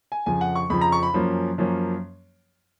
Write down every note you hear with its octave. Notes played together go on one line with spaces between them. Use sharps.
G#5
F2 C#3 F3 G#5
F#5
C#6
F2 C#3 F3 B5
A#5
C#6
B5
F#2 F3 A#3 C#4
F#2 F3 A#3 C#4